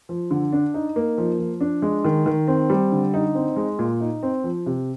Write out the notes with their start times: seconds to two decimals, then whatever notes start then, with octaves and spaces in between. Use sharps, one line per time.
0.09 F3
0.31 D3
0.52 D4
0.74 D#4
0.96 A#3
1.18 F3
1.39 F3
1.61 D4
1.82 G#3
2.05 D#3
2.26 D#3
2.48 C4
2.70 G3
2.92 D3
3.14 D#4
3.35 C4
3.56 G#3
3.79 A#2
4.00 D#4
4.23 C4
4.44 F3
4.66 C3